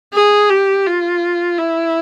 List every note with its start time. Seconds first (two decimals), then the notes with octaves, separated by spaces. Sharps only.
0.14 G#4
0.50 G4
0.86 F4
1.58 E4